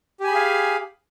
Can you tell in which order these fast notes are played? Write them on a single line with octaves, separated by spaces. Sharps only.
G4 G#5 B5 G#4 F5